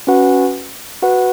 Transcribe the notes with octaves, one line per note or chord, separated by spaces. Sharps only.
C#4 F#4 B4 F#5
F#4 B4 F#5